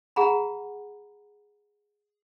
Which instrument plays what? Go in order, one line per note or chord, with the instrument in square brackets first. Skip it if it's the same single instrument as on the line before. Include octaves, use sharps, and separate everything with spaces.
[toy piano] G#4 F#5 A#5 B5